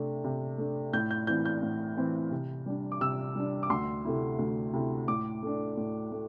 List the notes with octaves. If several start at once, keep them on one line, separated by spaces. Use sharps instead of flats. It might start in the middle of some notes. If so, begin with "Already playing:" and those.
Already playing: C3 A3 D4
C3
A3 D4
A2 G6
G6
E3 C4 G6
G6
A2
E3 C4
C3
G3 D4
D6
C3 E6
G3 D4
D6
D2 C6
C3 A3 E4
D2
C3 A3 E4
A2 D6
A3 D4
A2
A3